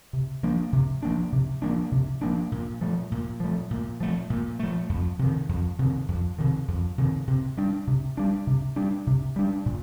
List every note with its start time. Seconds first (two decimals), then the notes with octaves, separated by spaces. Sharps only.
0.13 C3
0.43 F3 A#3 D4
0.72 C3
1.03 F3 A#3 D4
1.32 C3
1.62 F3 A#3 D4
1.92 C3
2.21 F3 A#3 D4
2.52 A#2
2.81 F3 A3
3.11 A#2
3.40 F3 A3
3.71 A#2
4.00 F3 A3
4.30 A#2
4.59 F3 A3
4.89 F2
5.19 C3 D#3
5.49 F2
5.79 C3 D#3
6.08 F2
6.39 C3 D#3
6.68 F2
6.98 C3 D#3
7.27 C3
7.57 G3 D4
7.87 C3
8.17 G3 D4
8.47 C3
8.76 G3 D4
9.07 C3
9.36 G3 D4
9.66 A#2